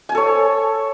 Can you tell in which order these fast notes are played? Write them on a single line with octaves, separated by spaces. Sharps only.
G#5 A5 A4 C#5